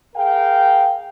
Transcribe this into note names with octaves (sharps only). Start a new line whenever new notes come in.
G#4 A#4 F5 G5